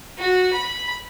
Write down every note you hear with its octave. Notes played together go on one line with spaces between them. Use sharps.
F#4
B5